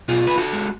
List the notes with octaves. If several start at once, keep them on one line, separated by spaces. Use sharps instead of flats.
B2 F4 G#4
B4
F#4 A4
G#3